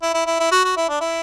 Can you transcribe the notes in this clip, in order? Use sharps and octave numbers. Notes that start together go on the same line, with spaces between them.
E4
E4
E4
E4
F#4
F#4
E4
D4
E4